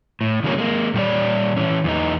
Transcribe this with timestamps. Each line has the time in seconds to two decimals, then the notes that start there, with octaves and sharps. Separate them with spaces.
0.21 A2
0.44 C#3 F3 G3 A#3 C#4
0.58 G#3 A#3
0.94 A#2 G3 F#4 C#5 D5
1.57 E3 C#4
1.84 E2 E3 D#4